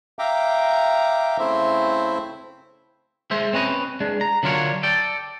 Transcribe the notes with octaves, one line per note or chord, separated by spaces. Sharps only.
E5 F5 G5 A#5 D6
C#3 A3 C4 E4 C5 E5
G#3 C5 E5
C4 C#4 B4 D#5
G#3 D4
A#5
D3 F#3 D4 F4 A#4 C#5
A4 D5 G5